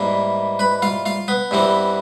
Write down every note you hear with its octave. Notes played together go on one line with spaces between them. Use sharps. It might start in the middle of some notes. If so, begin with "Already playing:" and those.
Already playing: G#2 E3 G3 A#3
B4 B5
F4 F5
F4 F5
B3 B4
G2 E3 G3 C4